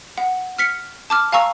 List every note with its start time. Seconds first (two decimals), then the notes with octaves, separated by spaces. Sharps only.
0.18 F#5
0.58 F6 B6 C#7
1.10 A5 D6 F6
1.32 F5 G#5 A#5 C#6 E6